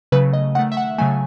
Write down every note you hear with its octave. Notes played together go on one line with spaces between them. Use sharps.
C#3 F#3 A3 B4
D#5
D#3 A3 F#5
E5
F#5
C#3 F#3 A3 G#5